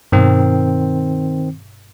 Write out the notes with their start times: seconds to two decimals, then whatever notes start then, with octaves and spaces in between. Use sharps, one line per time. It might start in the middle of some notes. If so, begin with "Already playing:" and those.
0.12 G2 B2 D#3 C4